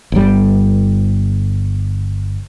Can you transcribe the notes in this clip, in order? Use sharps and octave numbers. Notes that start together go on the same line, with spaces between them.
G1 G3